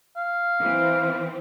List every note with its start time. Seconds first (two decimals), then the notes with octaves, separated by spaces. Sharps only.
0.17 F5
0.60 E3 C4